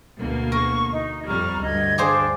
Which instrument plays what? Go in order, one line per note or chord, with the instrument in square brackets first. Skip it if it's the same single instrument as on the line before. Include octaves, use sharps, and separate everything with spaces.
[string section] D2 B2 A#3
[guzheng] A#4 [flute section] C#6
[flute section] D#4
[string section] F2 G3 [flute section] A#5 C#6 F6
[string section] D2 G2 [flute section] D#5 G#6
[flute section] D4 F5 [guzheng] G4 G#4 C5